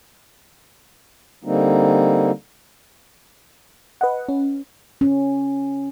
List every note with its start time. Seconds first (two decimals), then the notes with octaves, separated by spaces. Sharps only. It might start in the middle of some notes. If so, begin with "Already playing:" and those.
1.44 D3 G3 A#3 C4 D#4
4.01 B4 D#5 F#5
4.29 C#4
5.01 C#4